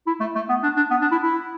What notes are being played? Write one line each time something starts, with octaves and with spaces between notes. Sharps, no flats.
E4
A3
A3
B3
D4
D4
B3
D4
E4
E4